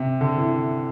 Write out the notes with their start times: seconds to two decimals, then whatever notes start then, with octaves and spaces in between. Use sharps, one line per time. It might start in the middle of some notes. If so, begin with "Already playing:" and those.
Already playing: C3
0.21 D3
0.38 E3